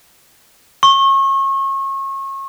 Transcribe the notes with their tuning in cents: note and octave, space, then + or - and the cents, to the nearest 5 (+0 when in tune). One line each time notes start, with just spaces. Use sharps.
C#6 -30